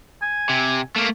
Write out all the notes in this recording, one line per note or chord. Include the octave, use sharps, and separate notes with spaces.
G#5
C3
A3 A#3